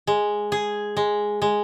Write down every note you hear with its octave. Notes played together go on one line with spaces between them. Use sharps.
G#3
G#4
G#3
G#3